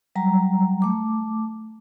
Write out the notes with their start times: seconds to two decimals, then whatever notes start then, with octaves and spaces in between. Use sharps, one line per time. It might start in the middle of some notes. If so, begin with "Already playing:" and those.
0.15 F#3 G3 A#5
0.82 A3 D6